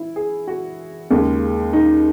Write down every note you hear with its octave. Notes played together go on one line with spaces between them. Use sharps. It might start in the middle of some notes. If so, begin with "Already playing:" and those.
Already playing: E3 E4
G#4
F#4
D#2 C#3 G#3
D#4